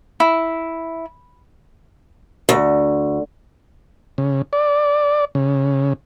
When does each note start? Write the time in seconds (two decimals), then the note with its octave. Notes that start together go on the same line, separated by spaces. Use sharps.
0.20 E4
2.49 D2
4.18 C#3
4.53 D5
5.35 C#3